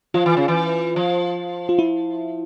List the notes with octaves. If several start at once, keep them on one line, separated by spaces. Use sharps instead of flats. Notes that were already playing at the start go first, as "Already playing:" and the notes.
F3 F4
E3
C#3
E3
F3
F4
E4